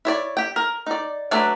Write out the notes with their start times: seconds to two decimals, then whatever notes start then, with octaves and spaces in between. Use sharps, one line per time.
0.05 E4 C#5 D5
0.37 G4 G5
0.56 A#4
0.87 D#4 D5
1.31 F#3 A3 D4 B4 D5